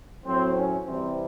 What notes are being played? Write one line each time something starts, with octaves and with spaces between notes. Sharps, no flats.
A2 F#3 C4
C#4
C3 E3 G3 C4